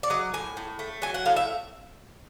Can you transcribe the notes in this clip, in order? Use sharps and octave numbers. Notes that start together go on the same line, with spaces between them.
D5
F#3 D#5
A2 G#5
A2
A3
F#3 G#5
F#5
A2 F5
E5